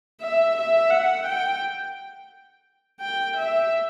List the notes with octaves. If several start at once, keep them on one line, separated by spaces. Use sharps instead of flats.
E5
E5
F#5
G5
G5
E5